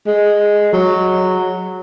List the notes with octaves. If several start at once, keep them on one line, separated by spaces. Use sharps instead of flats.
G#3
F#3